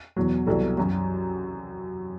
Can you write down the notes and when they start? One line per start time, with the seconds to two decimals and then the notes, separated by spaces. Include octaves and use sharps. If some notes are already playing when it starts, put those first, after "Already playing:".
0.16 E2 B2 F#3
0.46 C2 B2 F#3 A4
0.77 F#2 F#3